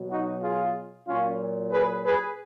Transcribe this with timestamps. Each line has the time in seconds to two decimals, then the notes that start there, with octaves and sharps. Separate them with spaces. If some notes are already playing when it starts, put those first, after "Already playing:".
Already playing: B2 F#3
0.11 D#4 F#4
0.42 F4 G#4
1.08 A#2 F#3 C#4 F4
1.72 G#4 B4
2.03 G#4 B4